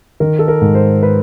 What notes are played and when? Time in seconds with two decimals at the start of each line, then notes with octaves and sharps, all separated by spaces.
0.20 D#3 A#4
0.39 A4
0.48 A#4
0.61 G#2
0.75 C5
1.03 B4